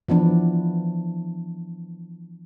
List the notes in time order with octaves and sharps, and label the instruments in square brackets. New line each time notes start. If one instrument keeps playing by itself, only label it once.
[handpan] E3 F3 B3 D4